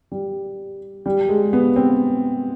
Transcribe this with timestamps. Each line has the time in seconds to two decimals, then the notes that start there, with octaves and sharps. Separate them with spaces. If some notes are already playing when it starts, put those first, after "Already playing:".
0.12 G3
1.06 G3
1.29 G#3
1.53 B3
1.76 C4